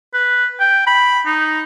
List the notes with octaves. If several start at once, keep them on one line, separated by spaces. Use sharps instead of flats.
B4
G5
B5
D#4